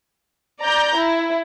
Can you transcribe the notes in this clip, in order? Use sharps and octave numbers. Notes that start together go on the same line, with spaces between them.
D5 A#5 G6
E4